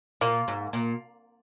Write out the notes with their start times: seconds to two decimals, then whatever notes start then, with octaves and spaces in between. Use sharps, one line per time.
0.21 A#2 A#3
0.48 G#2
0.73 A#2